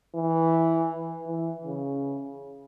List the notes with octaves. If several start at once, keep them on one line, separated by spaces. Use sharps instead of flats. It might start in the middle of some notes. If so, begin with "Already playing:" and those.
E3
E3
C#3